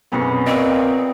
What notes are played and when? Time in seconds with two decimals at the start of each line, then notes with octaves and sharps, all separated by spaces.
0.12 B1 F#2 C3 B3 G#4 C#5
0.47 A#2 C4 D#5 C#6